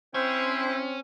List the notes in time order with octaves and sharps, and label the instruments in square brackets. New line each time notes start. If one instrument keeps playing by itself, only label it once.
[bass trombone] C4 [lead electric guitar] C#4 [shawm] E4 [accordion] C5 G5